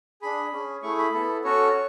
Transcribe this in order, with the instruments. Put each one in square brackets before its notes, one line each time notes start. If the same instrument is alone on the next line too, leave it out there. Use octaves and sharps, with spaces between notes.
[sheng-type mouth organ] D4 G#4 B5
C#4 G#4
A3 E4 G#4 C#6
B5
B3 E4 A4
C#4 F#4 A4 C#5